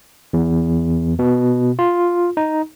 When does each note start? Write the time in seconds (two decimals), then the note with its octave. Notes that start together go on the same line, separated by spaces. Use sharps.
0.33 E2
1.19 B2
1.79 F4
2.37 D#4